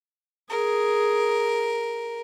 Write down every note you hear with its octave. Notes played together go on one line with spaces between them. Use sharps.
G#4 A#4